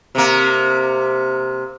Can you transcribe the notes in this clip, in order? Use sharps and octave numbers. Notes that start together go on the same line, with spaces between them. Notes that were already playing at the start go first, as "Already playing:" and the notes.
C3 A#3